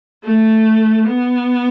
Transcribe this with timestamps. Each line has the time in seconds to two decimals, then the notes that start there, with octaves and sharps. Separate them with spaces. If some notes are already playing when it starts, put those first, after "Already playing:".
0.24 A3
1.07 B3